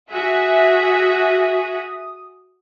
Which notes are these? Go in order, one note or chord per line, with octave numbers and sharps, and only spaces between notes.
F#4 G#4 E5 D#6